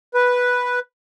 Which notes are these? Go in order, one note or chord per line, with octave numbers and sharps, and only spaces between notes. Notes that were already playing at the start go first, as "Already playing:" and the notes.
B4